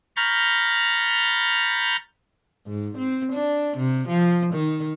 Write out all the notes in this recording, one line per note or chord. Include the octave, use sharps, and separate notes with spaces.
A#5 B5 C#6 F6 G6 A6
G#2
C4
D4
C3
F3
D#3